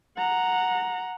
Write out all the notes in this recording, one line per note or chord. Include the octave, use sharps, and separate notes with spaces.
F#5 A#5